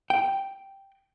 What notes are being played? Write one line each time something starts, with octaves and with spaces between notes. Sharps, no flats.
G5